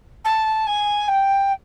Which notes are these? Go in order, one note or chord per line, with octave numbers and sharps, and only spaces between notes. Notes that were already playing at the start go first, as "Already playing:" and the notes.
A5
G#5
G5